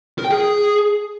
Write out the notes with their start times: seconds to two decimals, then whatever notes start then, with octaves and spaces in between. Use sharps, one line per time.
0.18 A#4
0.24 G5
0.31 G#4